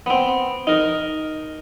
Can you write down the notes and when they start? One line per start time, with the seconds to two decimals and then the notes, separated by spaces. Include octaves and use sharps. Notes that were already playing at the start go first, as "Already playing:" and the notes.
0.06 B3 C4
0.67 D#4 A#4